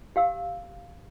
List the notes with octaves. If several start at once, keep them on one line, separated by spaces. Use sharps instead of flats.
G4 F5 E6